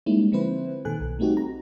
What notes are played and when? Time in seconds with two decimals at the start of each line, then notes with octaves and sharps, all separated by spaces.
0.06 G3 G#3 A#3 C#4 D#4 E4
0.32 D3 F3 C4 E4 B4 C5
0.85 A#2 D#3 A4 G#5 F#6
1.00 B1
1.19 G3 A3 C4 D#4 F#4 G4
1.37 A#5